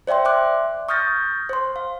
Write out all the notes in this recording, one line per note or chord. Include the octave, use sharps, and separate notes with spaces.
C5 D5 E5 G5 C6
E5 C6 D6 F#6
C#6 D#6 F6 G6 A6 A#6
C5 C6
F5